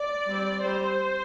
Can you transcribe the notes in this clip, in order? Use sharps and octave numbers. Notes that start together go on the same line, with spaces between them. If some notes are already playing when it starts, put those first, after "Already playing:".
Already playing: D5
G3 C4
G3 C4 C5